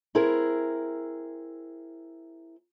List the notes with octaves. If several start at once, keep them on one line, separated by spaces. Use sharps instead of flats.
C4 E4 G#4 A#4